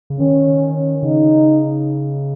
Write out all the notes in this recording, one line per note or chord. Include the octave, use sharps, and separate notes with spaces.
C#3
D#3 C#4
C#3 D#4